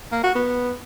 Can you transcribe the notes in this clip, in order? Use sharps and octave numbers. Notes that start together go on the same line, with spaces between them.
A#3
F#4
B3